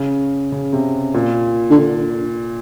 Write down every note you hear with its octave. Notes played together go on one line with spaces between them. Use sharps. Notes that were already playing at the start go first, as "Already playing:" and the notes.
Already playing: C#3
C#3
C3
A#2
D3